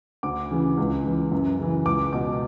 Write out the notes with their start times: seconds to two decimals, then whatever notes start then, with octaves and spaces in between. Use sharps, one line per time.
0.23 D2 D6
0.51 C#3 E3
0.77 C#2
1.05 C#3 E3
1.32 F#2
1.59 C#3 E3
1.86 C#2 D6
2.13 B2 D6